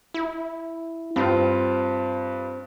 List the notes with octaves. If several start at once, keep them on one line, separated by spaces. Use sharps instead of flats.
E4
G2 C4 F4